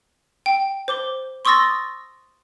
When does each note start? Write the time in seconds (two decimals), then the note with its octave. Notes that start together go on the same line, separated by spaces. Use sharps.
0.46 G5
0.88 C5 D6 G7
1.45 C6 C#6 D#6 E6 A6 A#6